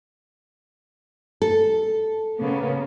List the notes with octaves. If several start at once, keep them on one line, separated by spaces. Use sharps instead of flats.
A4
C#3 A#3 B3